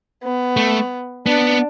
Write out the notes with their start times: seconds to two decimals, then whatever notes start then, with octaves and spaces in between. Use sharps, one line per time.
0.23 B3
0.57 A3
1.26 B3 D4